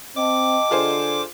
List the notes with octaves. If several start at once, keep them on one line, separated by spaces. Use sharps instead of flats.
C4 D#5 G5 A5 D6
D3 F4 G#4 C5